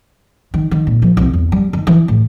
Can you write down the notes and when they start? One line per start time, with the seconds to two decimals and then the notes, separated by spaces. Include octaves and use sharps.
0.54 D#3
0.71 D#3
0.87 A#2
1.02 F3
1.17 C2
1.34 E2
1.52 G3
1.73 D#3
1.87 E3
2.08 A2